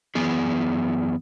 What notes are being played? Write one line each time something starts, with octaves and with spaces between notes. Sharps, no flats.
F#2 E3 B3 G#4